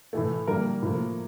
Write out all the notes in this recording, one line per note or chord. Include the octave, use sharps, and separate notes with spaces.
A2 E3 A3
D3 G3 A#3 A#4
A2 F3 A#3